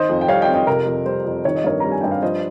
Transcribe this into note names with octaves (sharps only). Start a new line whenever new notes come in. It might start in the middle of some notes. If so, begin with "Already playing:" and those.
Already playing: D#3 C5 D#5
F2
G5
G3 C#5 F5
D#5 G5
F2
D#5 G5
C3 A#4
F2
G3 C5
F2
D#3 C#5
D#5
G2 A#4 C#5
G3 A#5
G#5
G2 G5
F5
F3 C5 D#5